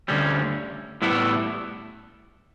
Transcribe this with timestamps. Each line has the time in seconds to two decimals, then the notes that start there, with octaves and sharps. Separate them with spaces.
0.08 D2 D3 G3 C#4
1.02 A2 G3 B3 E4 A4